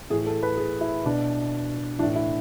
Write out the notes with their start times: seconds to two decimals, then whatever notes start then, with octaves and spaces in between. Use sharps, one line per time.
0.10 A2 E3 G#4
0.26 A4
0.43 B4
0.57 G#4
0.81 E4
1.05 B2 D4
1.99 E3 D4
2.03 A2
2.16 E4